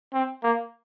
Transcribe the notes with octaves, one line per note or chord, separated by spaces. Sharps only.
C4
A#3